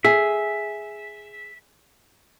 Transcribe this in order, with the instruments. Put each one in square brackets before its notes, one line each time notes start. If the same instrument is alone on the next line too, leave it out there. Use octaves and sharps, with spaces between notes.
[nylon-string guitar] G#4 [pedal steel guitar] E5